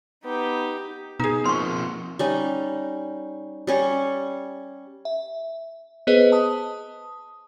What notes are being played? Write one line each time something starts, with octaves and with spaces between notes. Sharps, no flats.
B3 D#4 G4
B2 D#4 G#4
F3 A#3 C4 C6 C#6
G3 C#4 D#4
G3 C#4 C#5
E5
B3 G#4 B4 C5 D#5
A5 D#6